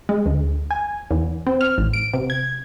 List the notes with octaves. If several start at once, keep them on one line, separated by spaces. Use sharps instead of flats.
G#3
D2
G#5
E2
C4
F6
A1
D7
C3
G#6